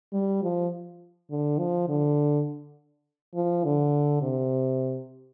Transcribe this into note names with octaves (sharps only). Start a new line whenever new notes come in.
G3
F3
D3
F3
D3
F3
D3
C3